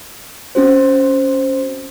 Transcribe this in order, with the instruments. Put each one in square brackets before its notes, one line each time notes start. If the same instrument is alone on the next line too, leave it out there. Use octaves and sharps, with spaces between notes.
[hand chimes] C4 C#4 F#4 C5